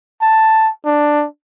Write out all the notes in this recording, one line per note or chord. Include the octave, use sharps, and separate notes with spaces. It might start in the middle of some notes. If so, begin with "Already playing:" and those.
A5
D4